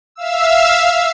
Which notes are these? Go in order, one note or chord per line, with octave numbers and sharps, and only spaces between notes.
E5 F5 E6